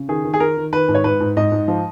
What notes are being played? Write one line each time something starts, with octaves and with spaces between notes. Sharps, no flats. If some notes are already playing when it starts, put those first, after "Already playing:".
Already playing: C#3
D#3 G#4
D#3
G#4
D#3 A#4
D#3
D#3 B4
G#2
C#5
G#2 B4
G#2
G#2 D#5
G#2
F3